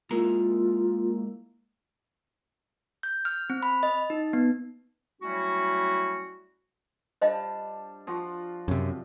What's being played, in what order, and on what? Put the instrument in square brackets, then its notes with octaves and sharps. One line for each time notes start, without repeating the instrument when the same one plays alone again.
[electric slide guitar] G#3 E4 A#5 [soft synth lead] A#3 [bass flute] F4
[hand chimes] G6
F6
C4
B5
D#5
D#4
B3
[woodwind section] F#3 G3 A3 C#4 E4 F#4
[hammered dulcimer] G3 D4 A5 [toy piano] C5 D#5 F5
[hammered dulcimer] F3 F4 F#4
[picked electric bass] F#2 C3